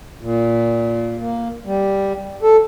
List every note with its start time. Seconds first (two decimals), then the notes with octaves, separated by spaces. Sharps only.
0.22 A#2
1.20 A#3
1.66 G3
2.43 A4